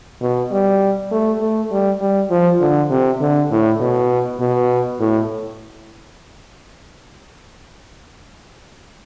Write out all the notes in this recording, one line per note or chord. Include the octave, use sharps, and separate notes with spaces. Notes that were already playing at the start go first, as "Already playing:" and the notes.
B2
G3
A3
A3
G3
G3
F3
D3
C3
D3
A2
B2
B2
A2